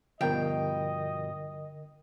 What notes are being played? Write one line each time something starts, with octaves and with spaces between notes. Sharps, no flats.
G2 B2 D3 F3 A#4 D#5 G5